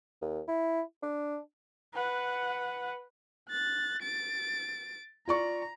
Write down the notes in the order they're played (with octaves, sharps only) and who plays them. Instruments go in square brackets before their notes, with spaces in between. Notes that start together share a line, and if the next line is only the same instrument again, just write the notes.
[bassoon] D#2
E4
D4
[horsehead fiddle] B4 F#5
[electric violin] F#6 A6
A6 D7
[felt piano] F4 D5 C#6 [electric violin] A#5